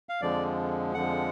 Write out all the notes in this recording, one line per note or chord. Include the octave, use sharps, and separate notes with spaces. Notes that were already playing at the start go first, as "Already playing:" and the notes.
F5
F2 D3 F3 G#3 D5
F2 D3 F3 G#3 F#5